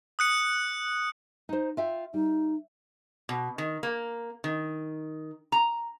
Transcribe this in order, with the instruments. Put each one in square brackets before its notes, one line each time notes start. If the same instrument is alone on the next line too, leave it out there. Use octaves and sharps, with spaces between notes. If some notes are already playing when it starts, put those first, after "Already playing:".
[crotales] D#6 F#6 C#7
[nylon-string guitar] D#4 C5
F4 E5 G5
[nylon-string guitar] G3 [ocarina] D#4
[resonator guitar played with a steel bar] B2
D#3
A#3
D#3
A#5